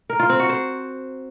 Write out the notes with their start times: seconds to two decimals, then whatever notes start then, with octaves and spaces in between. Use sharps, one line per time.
0.10 A#4
0.20 F4
0.30 C4
0.40 F#4
0.49 C5